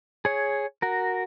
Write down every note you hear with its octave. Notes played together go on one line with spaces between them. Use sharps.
G#4 C#5
F#4 A#4